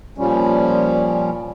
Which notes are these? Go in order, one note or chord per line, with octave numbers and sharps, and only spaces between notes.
A#2 F3 G3 C#4